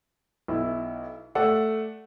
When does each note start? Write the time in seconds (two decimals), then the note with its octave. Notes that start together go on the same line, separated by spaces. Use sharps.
0.48 B1 E4
1.35 A3 A4 D5 F#5